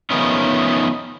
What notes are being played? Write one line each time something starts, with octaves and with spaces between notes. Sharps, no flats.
D#3 F3 A3 B3 C#4 D#4